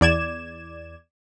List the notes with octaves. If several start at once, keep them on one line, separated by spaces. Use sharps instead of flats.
E2 D5 G#6 E7